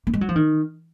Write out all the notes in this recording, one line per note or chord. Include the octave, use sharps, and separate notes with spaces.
A#3
G#3
F#3
F3
D#3